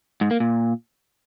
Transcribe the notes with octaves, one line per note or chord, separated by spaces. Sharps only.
G#2
A#3
A#2